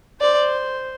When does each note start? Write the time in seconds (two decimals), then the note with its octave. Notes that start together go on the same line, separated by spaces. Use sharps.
0.21 C5 D5